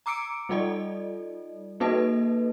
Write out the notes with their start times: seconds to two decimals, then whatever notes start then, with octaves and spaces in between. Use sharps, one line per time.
0.06 A#5 D6 E6 C#7 D7
0.49 G3 D#4 F4 A4 D5 D#5
1.80 A#3 D#4 F#4 A4 B4 D#5